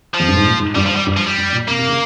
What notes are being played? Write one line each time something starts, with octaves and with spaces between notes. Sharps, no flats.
F3
F2
G2
G#2
A#2
G#2
G2 G3
F3
G3
G2
F3
G3
G2
A#2
C3 A#3
C3
C#3